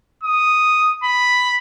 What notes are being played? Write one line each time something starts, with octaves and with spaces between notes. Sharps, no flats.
D#6
B5